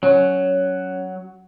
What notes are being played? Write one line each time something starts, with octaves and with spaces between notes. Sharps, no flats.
F#3 C#4